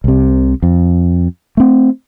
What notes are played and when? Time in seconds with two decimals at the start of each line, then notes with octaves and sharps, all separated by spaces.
0.04 C2 C3
0.63 F2
1.57 A3 C4